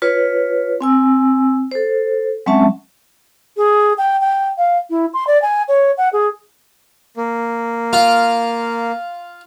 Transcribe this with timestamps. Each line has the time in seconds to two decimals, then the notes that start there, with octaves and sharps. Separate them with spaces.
0.02 F4 B4 C#5
0.81 C4 G#5 E6
1.72 A4 C5
2.46 F#3 G#3 C4 C#4 E5 A5
3.57 G#4
3.98 G5
4.21 G5
4.58 F5
4.90 E4
5.14 C6
5.27 D5
5.42 G#5
5.68 C#5
5.98 F#5
6.13 G#4
7.17 A#3
7.93 F4